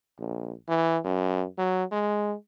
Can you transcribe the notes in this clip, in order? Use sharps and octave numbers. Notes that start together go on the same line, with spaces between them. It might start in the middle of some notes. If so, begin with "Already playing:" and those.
A#1
E3
F#2
F#3
G#3